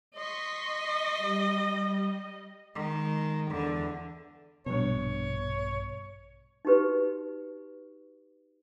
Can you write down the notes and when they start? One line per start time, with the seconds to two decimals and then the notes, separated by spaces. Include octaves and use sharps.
0.14 D#5 C6 C#6 B6
1.18 G3
2.75 D#3 G#3
3.51 E2 D3
4.66 A#1 G2 B2 C#5
6.65 D#4 F#4 G4 B4